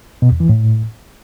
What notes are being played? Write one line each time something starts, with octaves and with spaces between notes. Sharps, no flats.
B2
E2
E3
A2